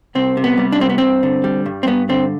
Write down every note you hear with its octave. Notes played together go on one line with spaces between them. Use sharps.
C2 C4
C3
B3
G3
D4
C2 C4
B3
G2 C4
D3
G3
G2
C4
G2 B3
D3 C4